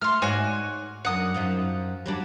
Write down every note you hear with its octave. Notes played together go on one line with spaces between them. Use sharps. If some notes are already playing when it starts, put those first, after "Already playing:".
A3 C6 F6
G#2 F#4 C#5 D5 G#5
F#2 D4 F#5 D#6
F#2 F3 D#4
F#3 G3 D4